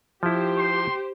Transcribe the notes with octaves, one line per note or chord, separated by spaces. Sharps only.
F3 E4 G4 C5
C6